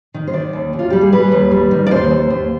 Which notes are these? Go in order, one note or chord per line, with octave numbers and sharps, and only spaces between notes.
D#3
C5
D#3 D5
D#2
D#2
F4
G3 G4
G#4
G3 B4
D#2
G3
D#3
D5
D#2 C5
D#2
D#2